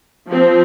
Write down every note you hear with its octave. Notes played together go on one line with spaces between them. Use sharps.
F3 C4